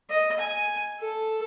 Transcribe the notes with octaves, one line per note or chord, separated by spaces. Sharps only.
D#5
G#5
A4